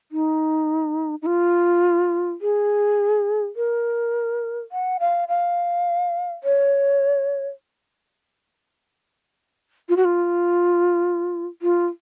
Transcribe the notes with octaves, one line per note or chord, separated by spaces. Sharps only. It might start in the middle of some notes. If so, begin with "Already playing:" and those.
D#4
D#4
F4
G#4
A#4
F#5
F5
F5
C#5
F4
F#4
F4
F4